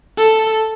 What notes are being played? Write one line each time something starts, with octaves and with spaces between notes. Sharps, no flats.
A4